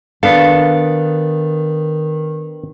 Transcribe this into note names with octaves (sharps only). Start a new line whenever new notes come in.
D#3 B3 D4 A4 F5